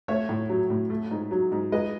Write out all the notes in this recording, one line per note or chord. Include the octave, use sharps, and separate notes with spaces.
A3 C#5 E5
A2
F#3
A2
A3
G#2
F#3
G#2
G#3 B4 D#5